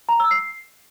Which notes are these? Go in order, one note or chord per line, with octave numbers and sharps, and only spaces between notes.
A#5
E6
C7